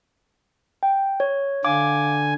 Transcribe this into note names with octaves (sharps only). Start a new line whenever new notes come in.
G5
C#5
D3 F5 G#5 D6